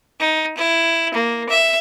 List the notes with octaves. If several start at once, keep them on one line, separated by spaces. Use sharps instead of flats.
D#4
E4
A#3
E5